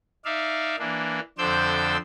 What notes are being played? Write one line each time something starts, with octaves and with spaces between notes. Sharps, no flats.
D#4 D5 E5 F5
E3 A#3 D4
F2 D3 C5 D5 E6 G6